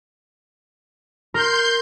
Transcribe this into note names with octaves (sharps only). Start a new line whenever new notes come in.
A#4 C6 G6